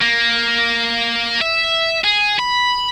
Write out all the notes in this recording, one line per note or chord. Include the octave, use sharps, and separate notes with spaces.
A#3
E5
G#4
B5